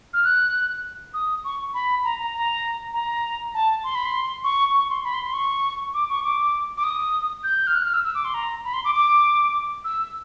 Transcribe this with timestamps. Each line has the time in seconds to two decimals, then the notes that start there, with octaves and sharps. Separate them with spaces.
0.14 F6
0.24 F#6
1.14 D#6
1.44 C#6
1.74 B5
2.04 A#5
2.19 A#5
2.35 A#5
2.93 A#5
3.54 A5
3.84 C6
3.95 B5
4.05 C6
4.44 C#6
4.74 C#6
4.90 C6
5.04 B5
5.14 C6
5.24 C6
5.34 C#6
5.94 D6
6.09 C#6
6.24 D6
6.77 D6
6.84 D#6
7.44 G6
7.67 F6
7.75 F#6
7.84 F6
7.94 E6
8.04 E6
8.15 D6
8.25 C6
8.34 A#5
8.65 B5
8.74 C6
8.85 D6
8.95 D6
9.84 E6